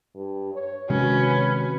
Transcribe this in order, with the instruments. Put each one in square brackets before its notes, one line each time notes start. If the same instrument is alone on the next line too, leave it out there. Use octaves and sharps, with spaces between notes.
[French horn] G2
C#5
[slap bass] C3 D#3 G#3 [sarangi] C#4 [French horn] F#4 [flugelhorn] B4